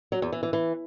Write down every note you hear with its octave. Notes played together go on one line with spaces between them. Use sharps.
F#3
E2
E3
E3
E3